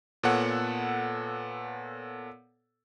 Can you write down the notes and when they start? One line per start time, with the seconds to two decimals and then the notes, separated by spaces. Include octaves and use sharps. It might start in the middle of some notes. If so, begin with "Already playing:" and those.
0.23 A#2 B3 A4 C#5 F#5